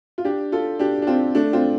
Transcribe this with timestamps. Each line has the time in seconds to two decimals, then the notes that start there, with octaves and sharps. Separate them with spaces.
0.18 F4
0.25 D4 G4
0.52 F4 A4
0.79 D4 G4
1.02 D4
1.07 C4 F4
1.35 A3 D4
1.53 C4 F4